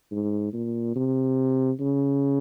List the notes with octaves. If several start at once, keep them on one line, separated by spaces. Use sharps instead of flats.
G#2
A#2
C3
C#3